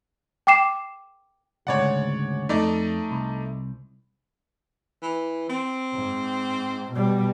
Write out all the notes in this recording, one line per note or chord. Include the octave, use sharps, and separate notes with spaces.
G5 D6 C7 E7
D2 G#2 C#3 C#5 D5 F#5
F2 A3 D#4 D5
C2
E3
C4
G#2
B2 G3